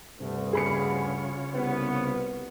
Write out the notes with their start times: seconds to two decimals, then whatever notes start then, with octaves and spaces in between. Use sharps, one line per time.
0.20 D2 G2 C3
0.53 C#3 F4 G#4 C#5 B5 C#7
1.54 C2 B3